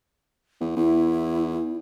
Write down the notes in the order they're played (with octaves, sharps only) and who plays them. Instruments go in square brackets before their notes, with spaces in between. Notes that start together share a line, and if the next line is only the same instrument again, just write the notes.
[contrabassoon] E2
[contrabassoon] E2 [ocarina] E4